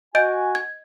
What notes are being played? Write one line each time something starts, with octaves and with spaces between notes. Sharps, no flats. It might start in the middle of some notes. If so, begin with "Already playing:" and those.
F#4 D#5 G#5 G6 D7
G#6